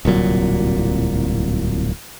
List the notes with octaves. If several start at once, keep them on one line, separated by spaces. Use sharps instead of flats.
D1 C2 A#2 F#3